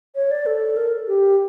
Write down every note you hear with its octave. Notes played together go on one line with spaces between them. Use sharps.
C#5
D5
A4
A#4
G4